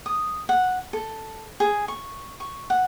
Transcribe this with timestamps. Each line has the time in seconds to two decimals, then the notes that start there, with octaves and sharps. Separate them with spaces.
0.06 D#6
0.49 F#5
0.93 A4
1.60 G#4
1.88 C#6
2.40 C#6
2.70 F#5